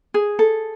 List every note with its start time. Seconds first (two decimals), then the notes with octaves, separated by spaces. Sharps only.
0.14 G#4
0.39 A4